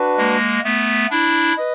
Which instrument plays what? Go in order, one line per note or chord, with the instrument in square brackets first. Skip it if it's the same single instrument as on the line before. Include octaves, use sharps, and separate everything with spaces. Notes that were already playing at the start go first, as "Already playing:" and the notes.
Already playing: [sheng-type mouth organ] D4 F#4 B4
[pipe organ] G#3 A#3
A3 B3
D4 E4
[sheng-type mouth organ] B4 D#5